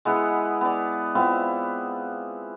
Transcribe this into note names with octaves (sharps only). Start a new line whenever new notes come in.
G#3 B3 E4 F#5
B3 D5
B3 C4 E4 F4